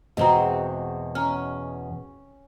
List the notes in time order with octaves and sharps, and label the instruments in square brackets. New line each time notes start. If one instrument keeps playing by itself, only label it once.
[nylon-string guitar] E2 B2 [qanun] G#3 C4 F#4 [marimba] D#5 F#5 A#5
[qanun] C#4 [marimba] A#5 F6